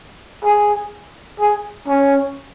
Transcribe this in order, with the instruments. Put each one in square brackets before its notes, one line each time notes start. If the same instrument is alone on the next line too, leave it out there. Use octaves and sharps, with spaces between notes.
[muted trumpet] G#4
G#4
C#4